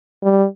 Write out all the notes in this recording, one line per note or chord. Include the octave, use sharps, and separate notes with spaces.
G3